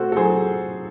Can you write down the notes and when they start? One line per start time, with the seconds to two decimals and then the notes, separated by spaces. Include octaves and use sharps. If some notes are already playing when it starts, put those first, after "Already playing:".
Already playing: A3 F#4 A4 C5
0.12 A4
0.16 F#3 G#4 C5